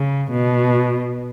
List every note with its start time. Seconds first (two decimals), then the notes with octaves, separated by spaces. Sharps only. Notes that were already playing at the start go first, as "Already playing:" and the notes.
Already playing: C#3
0.31 B2